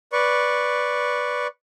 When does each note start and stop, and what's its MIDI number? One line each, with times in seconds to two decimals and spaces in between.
0.12 1.47 71
0.12 1.47 74
0.12 1.47 85